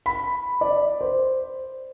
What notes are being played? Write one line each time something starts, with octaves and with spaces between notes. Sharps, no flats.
B5
D5
C5